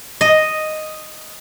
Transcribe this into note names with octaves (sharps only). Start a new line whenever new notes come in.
D#5